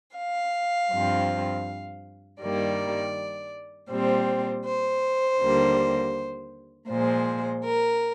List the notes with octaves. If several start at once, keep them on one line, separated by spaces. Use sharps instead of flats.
F5
G2 F3 C4
G2 D#3 G3 A#3 D5
A#2 G3 C4 C5
C5
D#2 D3 G3 A#3
A#2 F3 G#3 C5
A#4